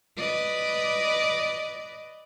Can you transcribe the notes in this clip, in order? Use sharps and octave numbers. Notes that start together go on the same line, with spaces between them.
B4 D5 D#5